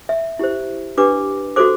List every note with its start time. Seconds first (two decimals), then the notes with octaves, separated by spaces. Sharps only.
0.09 E5
0.39 E4 G4 C5
0.97 D4 G4 B4 D6
1.56 F#4 A4 C5 D6